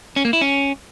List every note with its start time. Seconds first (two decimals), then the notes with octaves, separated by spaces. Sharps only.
0.16 C#4
0.25 A#3
0.33 E4
0.41 C#4